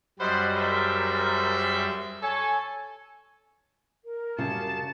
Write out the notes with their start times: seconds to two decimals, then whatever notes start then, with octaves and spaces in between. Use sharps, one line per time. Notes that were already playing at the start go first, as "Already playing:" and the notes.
0.19 F#2 G3 C5 D#5 F#5 B5
0.56 G#4 A#4 C5 E5
2.23 A4 C#5 G#5
4.05 A#4
4.38 F#2 C#3 G3 A5